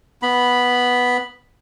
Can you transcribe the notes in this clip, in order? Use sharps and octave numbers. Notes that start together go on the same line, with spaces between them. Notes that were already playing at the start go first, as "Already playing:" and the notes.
B3 B5